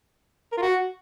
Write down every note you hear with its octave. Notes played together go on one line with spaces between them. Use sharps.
A#4
F4
F#4